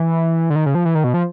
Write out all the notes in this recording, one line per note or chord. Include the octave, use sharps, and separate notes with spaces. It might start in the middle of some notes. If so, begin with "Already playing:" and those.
Already playing: E3
D3
D#3
C#3
F3
E3
D#3
B2
F3